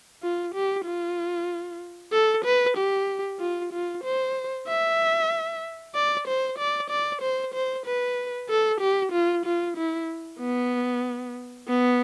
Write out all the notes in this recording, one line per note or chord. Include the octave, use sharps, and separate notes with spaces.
F4
G4
F4
A4
B4
G4
F4
F4
C5
E5
D5
C5
D5
D5
C5
C5
B4
A4
G4
F4
F4
E4
B3
B3